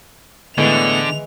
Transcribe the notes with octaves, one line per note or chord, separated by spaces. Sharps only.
A2 D3 E3 G#3 B3 F7